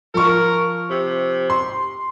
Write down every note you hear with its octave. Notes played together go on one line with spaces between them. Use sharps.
F3 A#4 C#6
C3
C6